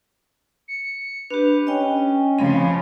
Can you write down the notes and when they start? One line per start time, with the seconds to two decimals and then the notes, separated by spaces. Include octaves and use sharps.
0.68 C#7
1.30 D4 G4 B4
1.67 C#4 D#5 G5
2.39 C#3 F3 C4 F5 B5